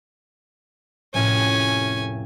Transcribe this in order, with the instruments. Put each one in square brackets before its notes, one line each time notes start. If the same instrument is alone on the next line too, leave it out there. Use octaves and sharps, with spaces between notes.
[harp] F1 A2 A#4 [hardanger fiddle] C#4 G#5